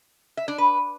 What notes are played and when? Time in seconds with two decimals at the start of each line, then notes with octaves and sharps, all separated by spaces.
0.37 E5
0.48 D4
0.58 B4